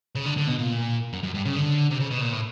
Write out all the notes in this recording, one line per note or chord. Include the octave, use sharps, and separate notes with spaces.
C#3
D3
D3
B2
A#2
F#2
F#2
G2
C#3
D3
C3
C#3
B2
A#2
A2